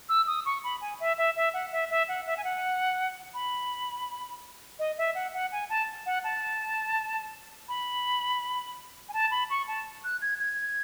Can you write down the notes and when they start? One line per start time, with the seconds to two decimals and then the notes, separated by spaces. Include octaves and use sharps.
0.09 E6
0.27 D#6
0.46 C#6
0.64 B5
0.81 G#5
1.00 E5
1.18 E5
1.36 E5
1.54 F#5
1.72 E5
1.90 E5
2.08 F#5
2.27 E5
2.37 G#5
2.44 F#5
3.34 B5
4.79 D#5
4.98 E5
5.15 F#5
5.34 F#5
5.52 G#5
5.70 A5
6.06 F#5
6.24 A5
7.69 B5
9.09 G#5
9.14 A5
9.31 B5
9.50 C#6
9.68 A5
10.04 F#6
10.22 G#6
10.40 G#6